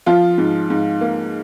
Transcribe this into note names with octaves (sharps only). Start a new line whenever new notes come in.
F3 F4
G#2
G#2
A#3